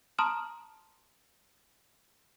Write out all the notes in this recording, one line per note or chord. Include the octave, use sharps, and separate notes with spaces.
A5 A#5 C6 D#6 F6 E7